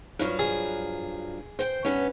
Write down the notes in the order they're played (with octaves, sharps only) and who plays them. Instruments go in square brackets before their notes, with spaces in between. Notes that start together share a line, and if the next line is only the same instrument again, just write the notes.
[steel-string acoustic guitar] G2 F3 F#3
[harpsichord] G#4
[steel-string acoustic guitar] C5 G5
G2 B3 C#4